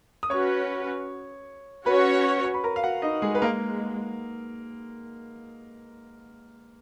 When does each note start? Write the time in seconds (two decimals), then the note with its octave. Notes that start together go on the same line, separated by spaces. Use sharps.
0.23 D#6
0.30 C#4 F#4 B4 C#5 C#6
1.86 C#4 F#4 B4 C#5 B5
2.45 C#6
2.54 B5
2.64 A#4 A#5
2.76 F5
2.83 F#4 F#5
3.02 D#4 D#5
3.22 G#3 G#4
3.35 B4
3.41 G#3 A#3 A#4